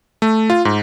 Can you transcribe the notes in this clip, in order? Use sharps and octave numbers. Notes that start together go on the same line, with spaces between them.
A3
F4
G#2